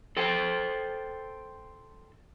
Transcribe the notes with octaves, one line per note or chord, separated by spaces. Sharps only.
A4 C5 G5